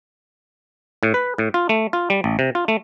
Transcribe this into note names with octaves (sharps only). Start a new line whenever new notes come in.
A2
B4
A2
F4
A3
F4
G3
A1
C3
F4
A3